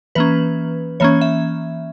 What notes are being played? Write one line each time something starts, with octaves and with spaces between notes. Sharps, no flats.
E3 A#3 C#4 B4
E3 A#3 C#4 C#5
E5